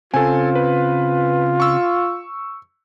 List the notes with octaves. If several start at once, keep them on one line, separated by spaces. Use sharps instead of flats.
C#3 C4 F4 A4 G#5
B4
C#6 E6